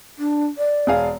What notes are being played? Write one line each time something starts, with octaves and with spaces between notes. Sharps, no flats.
D4
D5
E1 G#4 F5